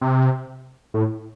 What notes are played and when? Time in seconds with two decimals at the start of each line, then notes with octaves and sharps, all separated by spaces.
0.01 C3
0.94 A2